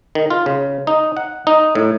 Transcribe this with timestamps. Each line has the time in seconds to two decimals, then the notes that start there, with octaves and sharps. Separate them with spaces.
0.15 D#3
0.30 F4
0.46 C#3
0.87 D#4
1.17 F#5
1.47 D#4
1.75 A2